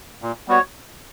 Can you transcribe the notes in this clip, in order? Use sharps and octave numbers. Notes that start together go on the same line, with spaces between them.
A#2
G3 B3 F#4 C#5